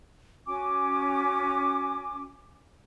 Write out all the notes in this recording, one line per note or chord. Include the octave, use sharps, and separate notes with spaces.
C#4 F#4 G#5 D6